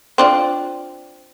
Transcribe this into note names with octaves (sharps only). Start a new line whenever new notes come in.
C4 D4 F4